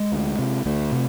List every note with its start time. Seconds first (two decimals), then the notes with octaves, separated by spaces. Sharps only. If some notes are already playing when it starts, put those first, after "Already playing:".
Already playing: G#3
0.12 D2
0.39 C3
0.65 D2 A3
0.92 C3